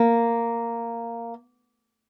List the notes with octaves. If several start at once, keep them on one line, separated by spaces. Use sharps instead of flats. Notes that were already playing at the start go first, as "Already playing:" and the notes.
Already playing: A#3